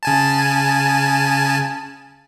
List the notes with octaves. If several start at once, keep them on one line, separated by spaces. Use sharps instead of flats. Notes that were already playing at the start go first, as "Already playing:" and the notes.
C#3 G#5 A5